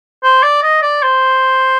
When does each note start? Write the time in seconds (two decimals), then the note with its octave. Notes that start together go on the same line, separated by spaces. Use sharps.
0.23 C5
0.43 D5
0.63 D#5
0.82 D5
1.03 C5